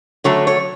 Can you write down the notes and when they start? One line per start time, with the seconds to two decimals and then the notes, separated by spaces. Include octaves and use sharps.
0.24 D3 F#3 A3 C#5
0.47 C#5